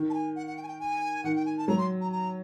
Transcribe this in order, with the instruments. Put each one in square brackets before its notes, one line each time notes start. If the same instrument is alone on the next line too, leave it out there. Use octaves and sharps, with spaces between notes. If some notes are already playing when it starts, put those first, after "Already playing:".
Already playing: [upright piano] D#3
[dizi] A5
G#5
F#5
F#5
G5
G#5
G5
G#5
[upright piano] D#3 [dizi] F#5
[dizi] G5
G#5
A5
[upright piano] F#3 [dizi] A#5
[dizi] C6
A#5
A#5